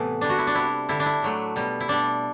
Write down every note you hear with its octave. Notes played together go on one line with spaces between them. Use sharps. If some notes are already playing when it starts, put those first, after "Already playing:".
Already playing: A2 C3 E3 A3 B3
D3 G3 D4
F#4
E4
D4
C3 G3 E4
D3 G3 E4
D4
E4
A2 F#3 A3
B2 G3
E4
B2 G3 D4